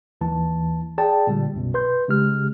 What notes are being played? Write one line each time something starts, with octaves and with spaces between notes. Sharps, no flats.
G1 D#2 E3 A5
G#4 D5 G5 A5
A#2 D3 G3
B1 F#2 B2
B4 C6 G6
C#3 G#3 G4 F6